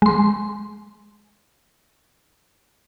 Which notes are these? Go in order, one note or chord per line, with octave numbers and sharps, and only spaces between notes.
G#3 C6